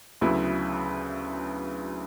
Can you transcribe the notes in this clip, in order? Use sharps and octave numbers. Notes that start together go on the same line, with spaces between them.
D2 C#3 F#3 B3 E4